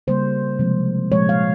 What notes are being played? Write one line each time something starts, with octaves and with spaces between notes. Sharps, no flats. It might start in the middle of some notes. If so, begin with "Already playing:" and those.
C#3 G3 A#3 C5
C3 F3 G#3
A#2 F3 G#3 C#5
F5